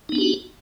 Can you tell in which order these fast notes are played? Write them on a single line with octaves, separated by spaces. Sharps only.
D#4 B3 D4 G4 F#4